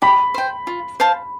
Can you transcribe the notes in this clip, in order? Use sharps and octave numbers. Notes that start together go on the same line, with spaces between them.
G4 B5
C5 G5
F4
C5 F5 A5